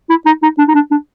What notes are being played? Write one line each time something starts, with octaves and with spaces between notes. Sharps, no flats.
E4
D#4
D#4
D4
D#4
D4
D4